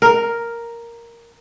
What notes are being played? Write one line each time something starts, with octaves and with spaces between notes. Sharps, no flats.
A#4